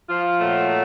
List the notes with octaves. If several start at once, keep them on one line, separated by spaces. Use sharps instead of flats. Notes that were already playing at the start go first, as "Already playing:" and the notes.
F3 F4
A#2 F#3 A3